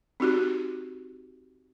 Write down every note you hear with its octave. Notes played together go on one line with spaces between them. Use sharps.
C4 D#4 F#4 G4